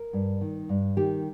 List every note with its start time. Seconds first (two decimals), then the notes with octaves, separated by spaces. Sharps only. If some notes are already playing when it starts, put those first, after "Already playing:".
Already playing: A#4
0.13 G2
0.41 D#3
0.69 G2
0.97 D#3 G4